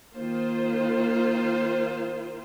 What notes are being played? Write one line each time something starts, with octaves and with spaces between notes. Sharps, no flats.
D#3 A#3 F4 C5